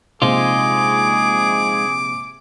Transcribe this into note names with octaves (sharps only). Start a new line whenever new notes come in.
A#1 C3 G#3 D#4 F4 G#4 C5 D6